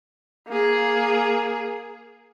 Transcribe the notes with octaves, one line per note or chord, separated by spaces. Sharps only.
A#3 G#4